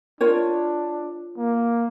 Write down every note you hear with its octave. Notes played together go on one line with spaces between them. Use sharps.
D4 F4 A#4 C#5
A#3